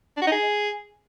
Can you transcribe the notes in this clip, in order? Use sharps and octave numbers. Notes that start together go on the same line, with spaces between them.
D4
F#4
D#4
G#4